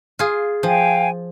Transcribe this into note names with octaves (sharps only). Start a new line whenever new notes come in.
F4 G#4
F3 F5 G5 G#5